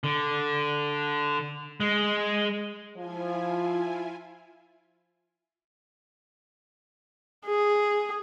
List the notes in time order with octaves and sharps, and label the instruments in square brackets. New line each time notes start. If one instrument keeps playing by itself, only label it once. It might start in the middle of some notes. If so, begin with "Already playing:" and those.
[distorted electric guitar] D3
G#3
[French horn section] F3 [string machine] E4 F4 G#5
[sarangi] G#4